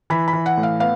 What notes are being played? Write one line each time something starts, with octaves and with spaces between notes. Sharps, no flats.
E3 B5
B5
E3
F#5
A2
F5
B3 F5